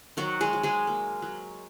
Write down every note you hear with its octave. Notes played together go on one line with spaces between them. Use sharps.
D#3 F#3 F#4
G#3 G#4
F#3
G#3 G#4
A#3
F#3